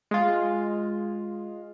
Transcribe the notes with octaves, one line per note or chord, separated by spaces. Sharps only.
G#3 F4